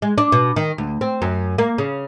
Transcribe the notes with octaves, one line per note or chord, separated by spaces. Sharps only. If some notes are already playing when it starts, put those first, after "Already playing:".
G#3
D4
B2
D#3
D2
C4
F#2
A#3
C#3